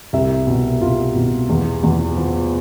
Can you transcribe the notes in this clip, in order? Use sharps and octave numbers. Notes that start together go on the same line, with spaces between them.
C2 E5
B2
B2 F4
B2
E2
E2
F3